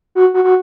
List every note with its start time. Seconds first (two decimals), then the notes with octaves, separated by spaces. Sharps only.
0.15 F#4
0.34 F#4
0.44 F#4